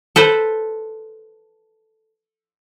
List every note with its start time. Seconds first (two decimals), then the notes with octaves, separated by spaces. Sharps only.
0.16 A4 B4 C5